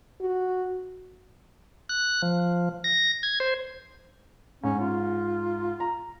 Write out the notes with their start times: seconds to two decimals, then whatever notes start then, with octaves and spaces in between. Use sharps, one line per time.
0.21 F#4
1.89 F#6
2.22 F3
2.84 A#6
3.23 G#6
3.40 C5
4.64 G#2 C#4
4.80 F4
5.80 A#5